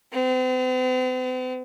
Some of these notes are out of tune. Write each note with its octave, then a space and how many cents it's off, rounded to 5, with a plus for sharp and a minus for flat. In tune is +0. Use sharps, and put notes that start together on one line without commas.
C4 -45